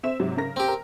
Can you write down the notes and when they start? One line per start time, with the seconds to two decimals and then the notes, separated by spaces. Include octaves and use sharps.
0.03 C4 E5 E7
0.20 G#2 C3 F#3
0.37 C#3 A#4 A#6
0.56 C4 G4
0.68 A#4